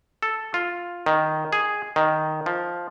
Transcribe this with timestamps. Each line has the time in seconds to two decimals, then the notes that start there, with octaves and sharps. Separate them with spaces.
0.23 A4
0.54 F4
1.06 D#3
1.53 G#4
1.96 D#3
2.46 F3